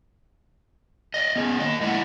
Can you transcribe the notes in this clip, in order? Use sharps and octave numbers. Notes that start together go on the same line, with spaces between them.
D5 D#5
B3 C#4 G#4
A#3 D#5
A2 G#3 E4 D5 F#5